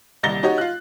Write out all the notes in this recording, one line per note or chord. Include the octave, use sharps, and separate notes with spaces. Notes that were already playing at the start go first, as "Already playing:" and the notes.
D#1 C2 A6 A#6 G7
D#4 F#4 G4 C#5 D#5
F4 F#6